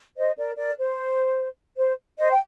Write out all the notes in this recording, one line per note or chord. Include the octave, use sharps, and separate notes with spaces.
C5 D#5
A#4 D5
A#4 D5
C5
C5
C5 D#5
G5